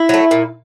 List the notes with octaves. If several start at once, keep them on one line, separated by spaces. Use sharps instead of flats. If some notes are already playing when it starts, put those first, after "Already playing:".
Already playing: E4
F#3 A3
A#2